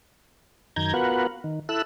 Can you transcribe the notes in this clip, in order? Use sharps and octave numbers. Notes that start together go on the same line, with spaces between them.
F#2 D#3 A#5 G6 G#6
B3 F4 F#4 A#4 B4 F#5
D#3
E4 A4 E6 F#6